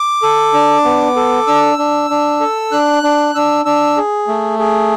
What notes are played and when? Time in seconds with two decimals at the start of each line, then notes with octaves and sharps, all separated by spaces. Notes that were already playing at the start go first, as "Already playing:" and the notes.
Already playing: D6
0.22 A4
0.54 D4
0.85 B3
1.16 A4
1.47 D4 E6
1.78 D4
2.10 D4
2.40 A4
2.72 D4 F#6
3.03 D4
3.35 D4 E6
3.65 D4 E6
3.97 G#4
4.28 A3
4.59 G#4